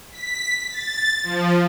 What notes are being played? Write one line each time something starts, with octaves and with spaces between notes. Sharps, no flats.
B6
A6
F3